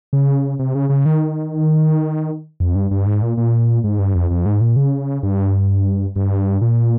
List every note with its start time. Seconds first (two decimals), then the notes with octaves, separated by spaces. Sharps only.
0.13 C#3
0.59 C3
0.75 C#3
0.89 C#3
1.06 D#3
2.60 F2
2.75 G2
2.91 G2
3.06 G#2
3.22 A#2
3.37 A#2
3.84 G#2
3.99 G2
4.15 F2
4.30 F2
4.46 G#2
4.61 A#2
4.76 C#3
5.23 G2
6.16 G2
6.61 A#2